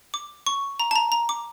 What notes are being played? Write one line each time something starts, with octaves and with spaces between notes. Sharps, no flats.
D6
C#6
A#5
A5
A#5
A#5
D6